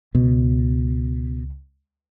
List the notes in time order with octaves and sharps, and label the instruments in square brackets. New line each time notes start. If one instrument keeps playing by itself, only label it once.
[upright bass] C#2 [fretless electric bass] B2